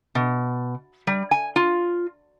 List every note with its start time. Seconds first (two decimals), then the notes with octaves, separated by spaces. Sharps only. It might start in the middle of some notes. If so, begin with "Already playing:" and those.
0.15 B2
1.07 G3
1.31 G#5
1.56 F4